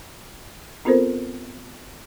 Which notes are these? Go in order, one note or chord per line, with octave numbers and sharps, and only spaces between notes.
B3 C4 F4 A4 A#4 C5